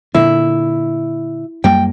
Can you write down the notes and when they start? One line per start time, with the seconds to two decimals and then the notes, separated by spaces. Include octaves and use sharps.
0.15 A#2 D3 E4
1.64 F#2 G3 A#3 G5